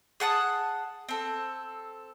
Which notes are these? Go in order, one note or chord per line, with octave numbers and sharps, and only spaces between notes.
G#4 F#5 A5 D#6
C4 A4